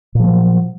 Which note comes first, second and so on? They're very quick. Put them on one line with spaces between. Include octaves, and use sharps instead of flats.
A#2 F3 G#3 F#3